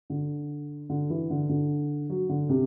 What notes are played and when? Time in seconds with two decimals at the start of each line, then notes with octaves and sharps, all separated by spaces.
0.10 D3
0.90 D3
1.10 E3
1.30 D3
1.49 D3
2.10 F#3
2.29 D3
2.49 C3